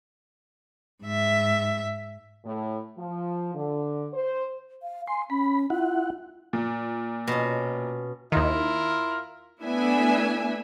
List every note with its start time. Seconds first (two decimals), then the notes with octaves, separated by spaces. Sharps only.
1.04 G#2 E5
2.45 A2
2.98 F3
3.55 D3
4.13 C5
4.82 F5
5.07 G#5 C6
5.30 C#4 B5
5.70 E4 F4 F#5
6.53 A#2
7.27 B2 C#4
8.32 D#2 D#3 E4 F4 A#4
9.63 A3 B3 D4 E4 E5 G#5